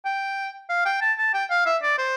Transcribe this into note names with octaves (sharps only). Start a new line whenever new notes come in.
G5
F5
G5
A5
A5
G5
F5
E5
D5
C5